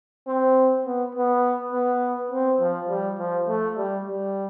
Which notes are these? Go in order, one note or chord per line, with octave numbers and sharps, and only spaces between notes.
C4
B3
B3
B3
C4
F3
G3
F3
A3
G3
G3